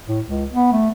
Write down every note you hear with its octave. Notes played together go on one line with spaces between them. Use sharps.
A2
C#2
B3
A3